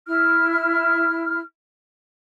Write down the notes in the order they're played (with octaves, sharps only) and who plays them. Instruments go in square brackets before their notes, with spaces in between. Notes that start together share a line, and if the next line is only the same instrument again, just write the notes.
[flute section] E4 F6